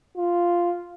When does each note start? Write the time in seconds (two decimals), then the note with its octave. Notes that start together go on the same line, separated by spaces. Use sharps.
0.17 F4